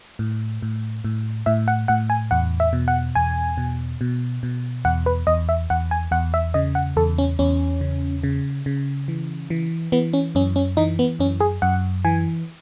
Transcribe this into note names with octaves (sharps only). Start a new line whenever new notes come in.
A2
A2
A2
A2 E5
F#5
A2 F#5
G#5
E2 F#5
E5
B2
F#5
E2 G#5
B2
B2
B2
E2 F#5
B4
E2 D#5
E5
E2 F#5
G#5
E2 F#5
E5
C#3 D#5
F#5
E2 A4
C#4
E2 C#4
C#3
C#3
C#3
E3
E3
E3 B3
C#4
F#2 C#4
C#4
E3 D#4
B3
F#2 C#4
G#4
F#2 F#5
E3 G#5